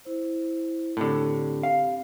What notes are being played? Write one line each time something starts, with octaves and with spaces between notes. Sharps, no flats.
E4 C5
A2 D3 C4 G4
F5